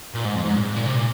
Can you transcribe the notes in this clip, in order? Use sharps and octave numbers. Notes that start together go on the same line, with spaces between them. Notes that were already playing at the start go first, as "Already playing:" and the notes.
A#2
G#2
F2
G#2
A#2
G#2
A#2
C3
A#2